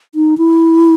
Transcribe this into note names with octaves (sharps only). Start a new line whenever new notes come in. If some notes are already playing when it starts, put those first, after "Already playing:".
D#4
E4